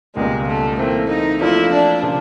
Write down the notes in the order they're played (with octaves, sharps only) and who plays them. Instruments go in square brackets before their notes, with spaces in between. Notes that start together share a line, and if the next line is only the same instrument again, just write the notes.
[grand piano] C#2 B2 G3 A#3 [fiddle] G#3
[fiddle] A3
[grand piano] E3 A3 C4 [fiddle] A#3
[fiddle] D#4
[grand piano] F3 A#3 D4 F4 A4 [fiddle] E4
[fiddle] D4
[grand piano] C#3 F3 A#3 D4 F4